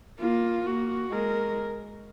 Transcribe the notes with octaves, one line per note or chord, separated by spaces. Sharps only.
A#3 F4
A#3 F#4
G#3 A#4